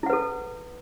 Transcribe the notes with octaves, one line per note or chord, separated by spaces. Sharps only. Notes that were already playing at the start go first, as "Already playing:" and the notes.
E4 A4 B4 F#5